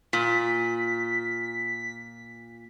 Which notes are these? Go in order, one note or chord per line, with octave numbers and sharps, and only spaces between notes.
A#2 B6